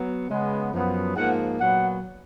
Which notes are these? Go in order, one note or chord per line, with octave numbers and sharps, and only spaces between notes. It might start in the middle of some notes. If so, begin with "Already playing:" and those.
Already playing: F#3 B3
C#3 G#3 B3
F#2 F3 B3
G#2 F3 A#3 F#5
A#2 F#3 B3 F#5